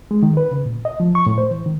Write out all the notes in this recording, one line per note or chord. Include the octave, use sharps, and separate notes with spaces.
G#3
D#3
B4
C#3
A#2
D#5
F3
C#6
A2
C5
E3
D#3